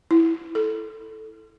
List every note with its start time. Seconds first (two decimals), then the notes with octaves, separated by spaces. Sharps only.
0.11 E4
0.55 A4